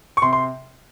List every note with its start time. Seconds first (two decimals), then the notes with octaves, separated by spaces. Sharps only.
0.17 C#6
0.22 C3 C6
0.33 C6